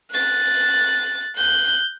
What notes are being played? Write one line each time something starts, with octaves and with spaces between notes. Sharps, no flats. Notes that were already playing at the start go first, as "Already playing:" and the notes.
F#6 A6
F#6 G6